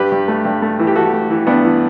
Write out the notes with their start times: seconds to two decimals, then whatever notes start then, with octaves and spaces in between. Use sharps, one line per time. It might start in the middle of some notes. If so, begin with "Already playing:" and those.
Already playing: G2 G4 B4
0.12 G2
0.28 A3
0.45 G2
0.62 A3
0.79 E3
0.87 G4
0.95 E3 F#4 A4
1.13 A3
1.30 E3
1.47 G2 B3 D4
1.64 E3